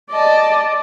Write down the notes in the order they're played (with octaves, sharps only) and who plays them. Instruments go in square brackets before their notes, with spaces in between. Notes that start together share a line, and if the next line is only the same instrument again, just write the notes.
[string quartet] D5 D#5 A5